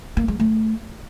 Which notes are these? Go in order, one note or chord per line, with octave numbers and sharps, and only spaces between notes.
A#3
G#3
A3